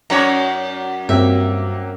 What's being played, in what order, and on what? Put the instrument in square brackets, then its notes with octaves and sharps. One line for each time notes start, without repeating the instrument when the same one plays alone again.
[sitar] F#2 F#4 C#5 [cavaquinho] D#4 [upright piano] D5 D6
[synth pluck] G2 C4 [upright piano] F#3 A#3 G4 [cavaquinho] E5